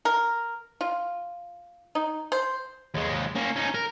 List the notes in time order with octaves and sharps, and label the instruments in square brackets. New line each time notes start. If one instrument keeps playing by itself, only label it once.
[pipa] A#4
F4
D#4
C5
[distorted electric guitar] D#2 G#3
A#3 C#4
C#4 D#4
A#4